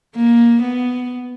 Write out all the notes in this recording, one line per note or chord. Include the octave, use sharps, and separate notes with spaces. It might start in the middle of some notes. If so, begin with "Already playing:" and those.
A#3
B3